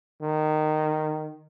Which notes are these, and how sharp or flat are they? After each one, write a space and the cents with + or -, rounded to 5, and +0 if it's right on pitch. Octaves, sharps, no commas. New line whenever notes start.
D#3 -15